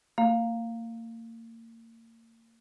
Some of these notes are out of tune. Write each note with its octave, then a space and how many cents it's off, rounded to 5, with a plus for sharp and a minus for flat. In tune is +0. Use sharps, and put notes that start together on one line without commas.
A#3 -35 F5 +0